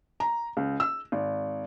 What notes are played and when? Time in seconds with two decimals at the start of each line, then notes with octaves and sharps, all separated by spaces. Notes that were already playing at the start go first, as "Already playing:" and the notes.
0.20 A#5
0.57 C#2
0.80 E6
1.12 G#1